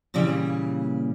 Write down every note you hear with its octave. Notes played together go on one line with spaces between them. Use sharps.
A#2 C#3 E3 G3 A#3